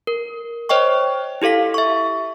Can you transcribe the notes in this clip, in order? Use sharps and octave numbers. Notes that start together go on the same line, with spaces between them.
A#4
C5 C#5 D#5 G5 C#6
E4 G4 A4 F5 B6
E5 C#6